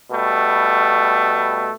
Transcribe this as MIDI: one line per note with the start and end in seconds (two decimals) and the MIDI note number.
0.11 1.70 47
0.11 1.70 55
0.11 1.70 57